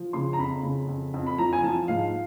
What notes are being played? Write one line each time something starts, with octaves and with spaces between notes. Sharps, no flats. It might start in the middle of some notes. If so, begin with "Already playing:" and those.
Already playing: F3
C#3 C6
A#5
F2 B5
C#3
F2
F2
B5
F3 A#5
G#5
F3 A5
G#2 F5